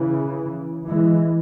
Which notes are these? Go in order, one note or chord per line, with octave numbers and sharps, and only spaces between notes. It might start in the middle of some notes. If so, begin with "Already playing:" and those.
Already playing: C#3 E3
E3 G#3